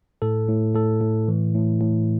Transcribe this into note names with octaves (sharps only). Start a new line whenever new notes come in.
A2 A4
A2
A2 A4
A2
E3
A2
A2